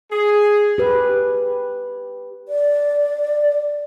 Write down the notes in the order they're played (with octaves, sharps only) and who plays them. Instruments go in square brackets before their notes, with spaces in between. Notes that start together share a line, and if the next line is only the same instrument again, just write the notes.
[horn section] G#4
[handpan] G4 B4
[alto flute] D5